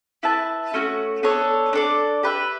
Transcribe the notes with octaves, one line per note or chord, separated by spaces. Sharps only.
E4 B4 E5 A5
A3 C#4 F#4
B3 D4 A4 C#5
D4 A4 D5
G4 B4 E5